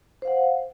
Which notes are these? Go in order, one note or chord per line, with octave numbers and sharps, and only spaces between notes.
C5 F5 F#5